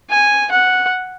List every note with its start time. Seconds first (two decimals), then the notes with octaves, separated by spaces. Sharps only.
0.10 G#5
0.52 F#5